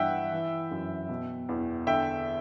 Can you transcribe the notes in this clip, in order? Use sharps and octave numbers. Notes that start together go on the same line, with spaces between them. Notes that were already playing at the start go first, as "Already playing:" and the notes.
Already playing: G2 E3 E5 F#5 G5
E3
F#2
B2
E2
D3 E5 G5